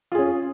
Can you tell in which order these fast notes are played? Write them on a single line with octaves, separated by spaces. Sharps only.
F4 G#4 C#4